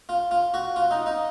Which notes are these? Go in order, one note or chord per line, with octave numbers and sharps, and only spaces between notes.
F4
F4
F#4
F4
D#4
D#4